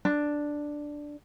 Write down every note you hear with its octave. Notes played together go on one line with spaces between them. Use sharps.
D4